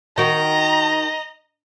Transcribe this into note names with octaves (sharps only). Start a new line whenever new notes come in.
D#3 F#4 D#5 A#5